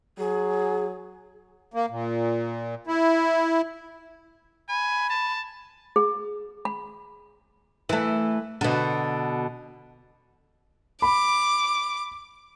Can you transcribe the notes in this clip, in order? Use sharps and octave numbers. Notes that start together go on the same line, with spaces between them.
F#3 G#4
A#3
A#2
E4
G#5 B5
A5
G#4
B5
E3 A3
B2 D3
B5 D6